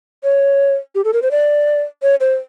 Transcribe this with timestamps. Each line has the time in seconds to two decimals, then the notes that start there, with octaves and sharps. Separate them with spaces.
0.24 C#5
0.95 G4
1.05 A4
1.13 A#4
1.22 C5
1.31 D5
2.03 C#5
2.20 C5